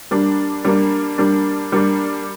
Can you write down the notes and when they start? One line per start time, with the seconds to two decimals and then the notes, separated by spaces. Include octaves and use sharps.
0.11 G3 A#3 D4
0.65 G3 A#3 D4
1.18 G3 A#3 D4
1.72 G3 A#3 D4